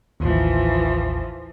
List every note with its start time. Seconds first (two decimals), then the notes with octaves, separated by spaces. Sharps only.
0.20 A1 D#2 E3 F3